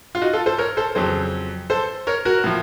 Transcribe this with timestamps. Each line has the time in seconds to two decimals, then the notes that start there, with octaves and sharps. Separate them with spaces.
0.15 F4
0.22 D#4 F#4
0.33 F4 A4
0.46 A4 C5
0.58 A#4 C#5
0.77 A4 C5
0.95 F2 C#3 F#3 A4 C5
1.70 A4 C5
2.07 A#4 C#5
2.25 F#4 A#4
2.44 A2 F3